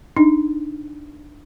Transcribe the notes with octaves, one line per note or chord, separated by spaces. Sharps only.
D4 D#4